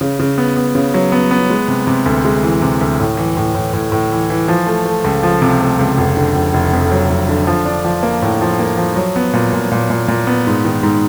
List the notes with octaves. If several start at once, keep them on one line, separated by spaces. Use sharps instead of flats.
C#3
C#3
B3
B3
C#3
F#3
B3
B3
G#3
C3
C3
D2
G#3
E3
C3
D2
A2
E3
A2
A2
A2
A2
E3
E3
F3
A3
A3
C#2
F3
C3
A3
C#2
F1
D3
F1
F1
F2
F#3
F1
D3
F3
D4
F3
A#3
A2
F3
A#3
F3
F#3
B3
A#2
A#2
A#2
A#2
A#2
B3
G#2
D#3
G#2